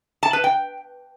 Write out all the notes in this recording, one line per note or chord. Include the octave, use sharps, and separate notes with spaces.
A5
B4
G5